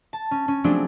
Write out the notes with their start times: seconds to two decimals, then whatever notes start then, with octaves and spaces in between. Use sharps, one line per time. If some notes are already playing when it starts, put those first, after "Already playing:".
0.13 A5
0.31 C#4
0.48 C#4
0.64 F3 F#3 A3 C4 D4 G#4